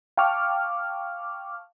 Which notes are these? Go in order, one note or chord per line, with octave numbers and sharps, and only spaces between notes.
F5 G5 A5 C#6 D6 F6